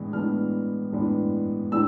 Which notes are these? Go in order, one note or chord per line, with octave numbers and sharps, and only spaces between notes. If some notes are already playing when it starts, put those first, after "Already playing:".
Already playing: A2 E3 G#3 B3 D4
A2 E3 G#3 B3 D4 F6
A2 E3 G#3 B3 D4
A2 E3 G#3 B3 D4 E6